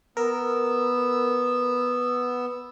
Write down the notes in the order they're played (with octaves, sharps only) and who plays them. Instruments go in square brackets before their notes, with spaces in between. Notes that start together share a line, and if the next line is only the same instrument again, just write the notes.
[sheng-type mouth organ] B3 E6 [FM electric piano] A#4